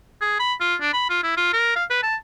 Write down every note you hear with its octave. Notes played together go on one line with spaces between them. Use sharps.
G#4
B5
F4
D4
B5
F4
E4
F4
A#4
F5
B4
A5